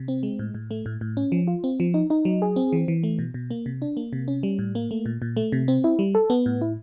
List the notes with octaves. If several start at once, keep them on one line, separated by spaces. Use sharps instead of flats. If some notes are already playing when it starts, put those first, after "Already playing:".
Already playing: C3
C4
G#3
A2
A2
A3
A2
A2
C#4
F3
F4
C4
F3
D#4
D#4
F#3
G#4
C4
E3
E3
A3
B2
B2
A#3
C3
D4
A#3
C3
C#4
G3
A2
A#3
A3
A#2
A#2
A3
C3
C4
E4
G3
A4
B3
A2
E4